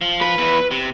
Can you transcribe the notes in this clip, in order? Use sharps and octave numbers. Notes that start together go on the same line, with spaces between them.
F3
B4
E2 E4
C3